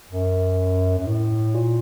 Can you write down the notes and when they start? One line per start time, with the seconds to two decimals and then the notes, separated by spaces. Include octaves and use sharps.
0.10 F#2
0.99 F#2
1.06 A2
1.55 A#2